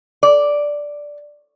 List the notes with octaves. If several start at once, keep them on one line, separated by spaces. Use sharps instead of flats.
D5